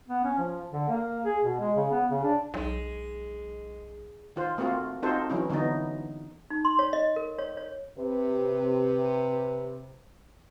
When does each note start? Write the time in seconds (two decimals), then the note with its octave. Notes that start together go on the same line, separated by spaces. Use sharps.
0.08 B3
0.24 C#4
0.38 F3
0.73 D3
0.88 A#3
1.25 G#4
1.43 B2
1.60 G#3
1.76 C#3
1.92 B3
2.10 C#3
2.24 D4
2.54 B1 G#3
4.36 D#3 F4 C5
4.58 A3 A#3 C4 F4 F#4
5.03 C4 D#4 F4 F#4 A4 C5
5.30 E3 F#3 C#4 E4
5.49 D3 E3 F#3 B3 D#4
6.50 D#4
6.65 C6
6.79 C#5
6.93 D#5
7.16 A#4
7.39 C#5
7.57 C#5
7.98 C3 B4